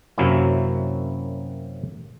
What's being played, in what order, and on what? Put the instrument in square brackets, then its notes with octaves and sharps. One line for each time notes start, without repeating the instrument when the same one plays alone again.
[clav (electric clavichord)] F#2 C3 F#3 A#3 C#4 E4